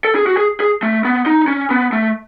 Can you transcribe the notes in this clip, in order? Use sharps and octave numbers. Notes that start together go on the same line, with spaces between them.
A4
G#4
F#4
G#4
G#4
A3
B3
D#4
C#4
B3
A3